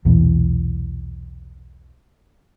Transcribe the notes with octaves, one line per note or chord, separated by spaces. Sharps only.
B1 E2 A#2 E3